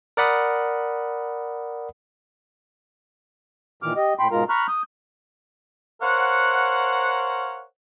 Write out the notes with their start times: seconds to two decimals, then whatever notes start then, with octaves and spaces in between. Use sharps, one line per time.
0.17 A#4 D5 F#5 B5 D#6
3.83 A#2 D#3 E3 D6 F6
3.96 G4 D#5
4.19 A2 G5 B5 C6
4.31 G#2 B2 G#3 F4 A#4 A#5
4.49 A#5 B5 C#6 F6 F#6
4.68 D#6 G6
6.02 A#4 C5 C#5 F5 F#5